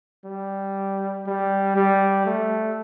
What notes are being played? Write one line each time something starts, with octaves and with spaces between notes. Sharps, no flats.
G3
G3
G3
A3